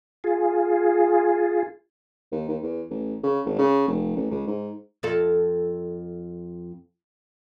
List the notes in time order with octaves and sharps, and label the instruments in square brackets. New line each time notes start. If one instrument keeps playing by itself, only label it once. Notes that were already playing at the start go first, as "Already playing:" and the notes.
[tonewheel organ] F4 G#4
[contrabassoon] D#2
D#2
E2
A1
C#3
G#1
C#3
F1
A1
C#2
G#2
[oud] F2 F4 A4